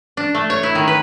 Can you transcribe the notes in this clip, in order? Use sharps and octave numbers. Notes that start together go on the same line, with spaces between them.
D4
A3
C#5
E4
D#3
B4